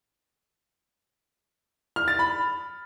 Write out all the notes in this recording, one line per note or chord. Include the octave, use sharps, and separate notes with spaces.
F6
A6
B5